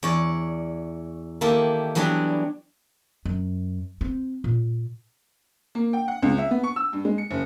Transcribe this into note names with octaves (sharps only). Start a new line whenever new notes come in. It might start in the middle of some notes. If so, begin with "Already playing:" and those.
E2 C#5 D5
D#3 A#3 E4 G4 A4
E3 F#3 G3 B3 D4
F#2
C4
A#2
A#3
G5
F#5
C#2
E5
B3
C#6
E6
G2
G#3
C#7
F#1